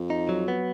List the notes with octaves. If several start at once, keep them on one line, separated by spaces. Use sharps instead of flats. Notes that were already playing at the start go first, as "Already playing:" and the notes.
Already playing: F2
D#4
F#3
B3